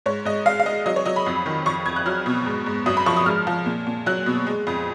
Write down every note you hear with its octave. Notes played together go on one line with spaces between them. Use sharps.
G#2 C#5
G#2 D#5
G#3 F5
F5
G#3 D#5
F#3 D#5
C#5
F#3 D#5
B5
F2
D#3
F2 C#6
F2 G#6
F#6
F#3 F6
B2
G#2
G#2
F#2 D#6
B5
F3 C#6
D#6
G#2 F6
F3
A#2
A#2
F#3 F#6
B2
G#3
F2